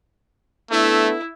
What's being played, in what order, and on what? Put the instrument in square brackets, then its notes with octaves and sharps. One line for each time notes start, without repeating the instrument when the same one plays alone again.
[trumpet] A3 [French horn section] B3 D4 A4 [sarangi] E4